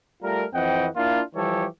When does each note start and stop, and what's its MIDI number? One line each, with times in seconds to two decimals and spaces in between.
0.23 0.44 55
0.23 0.44 57
0.23 0.44 65
0.23 0.44 70
0.54 0.87 41
0.54 0.87 52
0.54 0.87 60
0.54 0.87 75
0.54 0.87 78
0.54 0.87 79
0.96 1.21 58
0.96 1.21 62
0.96 1.21 64
0.96 1.21 65
1.35 1.66 52
1.35 1.66 53
1.35 1.66 55
1.35 1.66 67
1.35 1.66 69
1.35 1.66 73